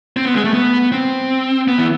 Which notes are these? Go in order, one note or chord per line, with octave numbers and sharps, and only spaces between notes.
C4
B3
G#3
A3
B3
C4
B3
E3